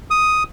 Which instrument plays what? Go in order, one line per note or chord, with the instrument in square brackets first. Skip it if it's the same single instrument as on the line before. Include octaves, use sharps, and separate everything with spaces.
[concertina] D#6